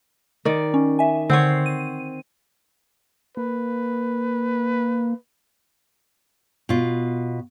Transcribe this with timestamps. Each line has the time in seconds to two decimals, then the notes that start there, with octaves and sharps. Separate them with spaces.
0.45 D#3 D5
0.74 C#4
0.99 E5 G#5
1.30 D3 C4 C#5 F#5 C7
1.66 D#7
3.37 A#3 B4
6.69 B2 F4